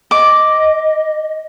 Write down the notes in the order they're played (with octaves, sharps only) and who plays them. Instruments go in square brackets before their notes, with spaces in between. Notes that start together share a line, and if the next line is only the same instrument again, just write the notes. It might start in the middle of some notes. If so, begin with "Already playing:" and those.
[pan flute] D#5 [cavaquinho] D6